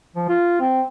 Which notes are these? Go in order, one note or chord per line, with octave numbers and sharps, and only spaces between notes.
F3
F4
C4